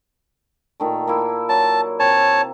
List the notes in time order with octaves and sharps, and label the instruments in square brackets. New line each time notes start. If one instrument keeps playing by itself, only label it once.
[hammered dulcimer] A#2 D#3 A3
A#3 E4
[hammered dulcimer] F#3 [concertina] A5
[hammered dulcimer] C3 [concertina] C#5 A5